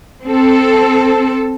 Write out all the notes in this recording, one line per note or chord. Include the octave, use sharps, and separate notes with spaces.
C4 A4